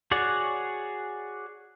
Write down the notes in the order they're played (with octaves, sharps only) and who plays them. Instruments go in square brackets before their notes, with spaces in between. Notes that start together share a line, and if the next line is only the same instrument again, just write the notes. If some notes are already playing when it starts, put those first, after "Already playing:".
[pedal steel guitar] F#4 G#4 C#5 D5 F#5